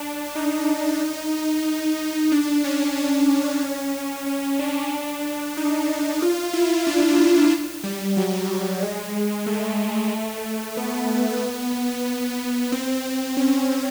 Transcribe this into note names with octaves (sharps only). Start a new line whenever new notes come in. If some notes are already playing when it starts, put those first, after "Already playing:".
Already playing: D4
D#4
D4
C#4
C#4
C#4
C#4
D4
D#4
F4
E4
D4
G3
F#3
G#3
A3
B3
C4
C#4